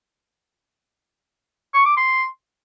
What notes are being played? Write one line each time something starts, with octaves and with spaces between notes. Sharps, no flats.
C#6
D6
C6